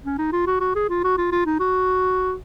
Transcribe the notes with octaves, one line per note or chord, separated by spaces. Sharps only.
C#4
D#4
F4
F#4
F#4
G#4
F4
F#4
F4
F4
D#4
F#4